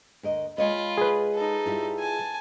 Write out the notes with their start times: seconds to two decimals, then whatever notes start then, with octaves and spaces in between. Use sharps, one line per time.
0.23 D2 A#4 D#5
0.58 G#3 F4 C#5 D#5 B5
0.98 G#4 B4
1.35 D#4 A4
1.66 G3 E4 F4
1.99 G#5 A5